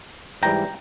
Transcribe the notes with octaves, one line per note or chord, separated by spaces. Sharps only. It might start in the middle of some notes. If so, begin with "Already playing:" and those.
G#2 E3 G3 G5 A#5